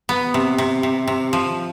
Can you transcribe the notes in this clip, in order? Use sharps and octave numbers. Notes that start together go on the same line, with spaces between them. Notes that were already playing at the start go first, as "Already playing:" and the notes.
B3
C3
C3
C3
C3
F3